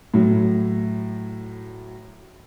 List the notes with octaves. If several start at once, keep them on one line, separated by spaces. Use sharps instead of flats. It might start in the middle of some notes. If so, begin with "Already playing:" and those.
A2 F#3